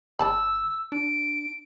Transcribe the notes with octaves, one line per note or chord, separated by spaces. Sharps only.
G1 D5 A5 B5 E6
D4 D7